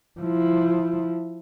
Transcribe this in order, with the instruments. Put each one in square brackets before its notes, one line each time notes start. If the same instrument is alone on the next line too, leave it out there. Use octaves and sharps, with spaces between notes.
[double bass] F3 E4